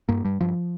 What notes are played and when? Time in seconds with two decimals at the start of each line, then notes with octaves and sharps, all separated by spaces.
0.09 G2 A#3
0.24 G2 G3
0.40 G2 F3